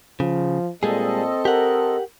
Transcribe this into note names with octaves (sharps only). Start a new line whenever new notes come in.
C#3 F3
A#2 G3 G#3 C4 G#4 A4 D#5
G4 A#4 F#5